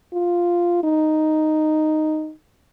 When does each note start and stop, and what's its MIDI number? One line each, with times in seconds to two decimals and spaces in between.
0.13 0.79 65
0.83 2.32 63